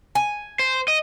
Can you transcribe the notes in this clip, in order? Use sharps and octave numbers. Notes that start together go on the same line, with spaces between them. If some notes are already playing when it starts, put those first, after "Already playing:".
G#5
C5
D#5